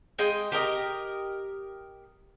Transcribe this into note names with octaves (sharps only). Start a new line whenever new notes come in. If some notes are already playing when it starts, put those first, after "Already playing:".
G#3 D#5 G5
G4 A#4 D#5